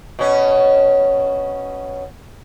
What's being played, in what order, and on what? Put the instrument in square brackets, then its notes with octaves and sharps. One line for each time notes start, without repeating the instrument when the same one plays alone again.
[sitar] B2 C#4